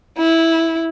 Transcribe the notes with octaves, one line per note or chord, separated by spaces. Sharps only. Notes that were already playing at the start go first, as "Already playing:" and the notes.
E4